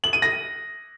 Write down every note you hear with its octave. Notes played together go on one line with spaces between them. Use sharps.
F#7
D#7
A#6